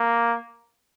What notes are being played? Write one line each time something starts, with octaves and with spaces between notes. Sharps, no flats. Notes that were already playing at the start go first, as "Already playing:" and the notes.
Already playing: A#3